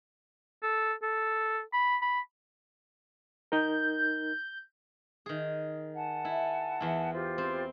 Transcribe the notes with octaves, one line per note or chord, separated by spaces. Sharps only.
A4
A4
B5
B5
D#4 A#4 G6
D#3 G#4
F#5 G#5 A5
E4
E2 E4
F4 G4 C5
C4